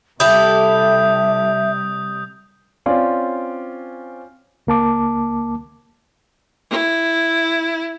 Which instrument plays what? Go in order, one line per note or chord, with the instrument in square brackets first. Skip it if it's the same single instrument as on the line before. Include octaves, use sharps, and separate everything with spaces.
[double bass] C3 G3 [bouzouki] E4 G4 A4 [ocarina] E5 [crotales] D#6 G6
[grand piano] C4 C#4 F4 D5 F5 G#5
[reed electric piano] C#2 A#3 A5 D6
[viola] E4